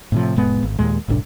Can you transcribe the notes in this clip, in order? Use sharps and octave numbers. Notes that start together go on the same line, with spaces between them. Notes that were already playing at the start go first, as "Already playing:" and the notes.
A2 C3 F3
F1 A2 G#3 B3
G#1
D#2 A#2 G#3
F#1 C2 A2 D4